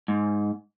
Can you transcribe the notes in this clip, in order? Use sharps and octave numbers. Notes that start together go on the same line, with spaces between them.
G#2